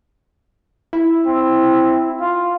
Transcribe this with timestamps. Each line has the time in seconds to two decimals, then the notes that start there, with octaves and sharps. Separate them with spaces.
0.93 E4
1.26 C4
2.20 F4